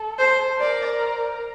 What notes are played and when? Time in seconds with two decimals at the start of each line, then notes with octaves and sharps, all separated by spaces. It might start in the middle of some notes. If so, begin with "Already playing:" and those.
Already playing: A4
0.19 C5
0.60 A#4 D5